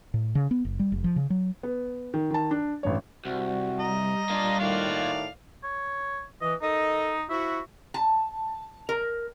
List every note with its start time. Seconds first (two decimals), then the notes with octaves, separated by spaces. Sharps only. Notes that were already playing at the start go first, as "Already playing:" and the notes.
0.14 A2
0.35 C#3
0.51 B3
0.65 F#1
0.79 G3
0.92 F1
1.04 F3
1.16 C#3
1.30 F#3
1.63 B3
2.14 D#3
2.31 D#3 A5
2.51 D4
2.83 A1 G2 C#5
3.25 C2 G3 C4 F#4
3.79 D#5 A#5
4.30 A#3 D4 F4
4.59 A2 D#3 F#4 D5 F5
5.64 C#5
6.42 E3 D#5
6.62 D#3 D#4 A4 D#5
7.30 F3 E4 F#4 E5
7.94 A5
8.89 A#4